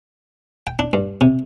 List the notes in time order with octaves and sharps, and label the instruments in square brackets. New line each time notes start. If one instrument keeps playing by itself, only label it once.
[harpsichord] G5
D4
G2
C3